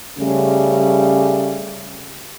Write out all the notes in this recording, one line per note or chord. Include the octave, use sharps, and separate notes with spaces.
C#3 G3 A3 C#4